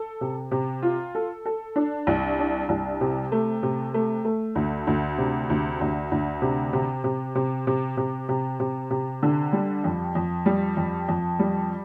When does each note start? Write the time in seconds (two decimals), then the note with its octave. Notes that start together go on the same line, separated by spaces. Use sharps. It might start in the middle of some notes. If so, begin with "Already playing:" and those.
Already playing: A4
0.21 C3
0.51 C3
0.82 F4
1.15 A4
1.45 A4
1.76 D4
2.07 C2
2.39 D4
2.69 C2
3.01 C3
3.32 A3
3.63 C3
3.94 A3
4.25 A3
4.55 D2
4.87 D2
5.18 C3
5.50 D2
5.81 D2
6.11 D2
6.42 C3
6.73 C3
7.04 C3
7.35 C3
7.67 C3
7.97 C3
8.29 C3
8.60 C3
8.90 C3
9.23 D3
9.53 G3
9.84 F2
10.15 F2
10.46 G3
10.77 F2
11.09 F2
11.39 G3